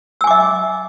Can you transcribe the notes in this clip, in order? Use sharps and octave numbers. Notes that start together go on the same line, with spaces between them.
E5 G#5 D6 E6